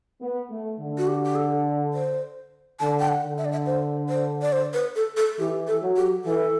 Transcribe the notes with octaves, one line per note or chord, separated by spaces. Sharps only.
B3
A3
D3
F#4
G4
G4
A4
C5
D3 A5
G5
F#5
D3
E5
D5
E5
C5
C5
D5
C5
B4
A4
A4
E3 G4
A4
F#3
G4
E3 A4